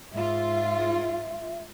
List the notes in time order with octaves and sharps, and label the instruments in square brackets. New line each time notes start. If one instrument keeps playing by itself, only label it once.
[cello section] G#2 F4 [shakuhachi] E5